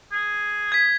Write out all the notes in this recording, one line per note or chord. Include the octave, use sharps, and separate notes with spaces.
G#4
G#6 B6